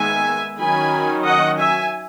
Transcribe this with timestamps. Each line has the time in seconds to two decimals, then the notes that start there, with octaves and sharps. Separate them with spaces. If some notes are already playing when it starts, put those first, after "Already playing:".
Already playing: D#3 G#3 B3 E5 G#5
0.59 D#3 F#3 C#4 G#5 B5
1.26 D#5 F#5
1.59 E5 G#5